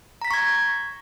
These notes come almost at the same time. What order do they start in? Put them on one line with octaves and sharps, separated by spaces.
A#5 B6 A#6 C#6 G#6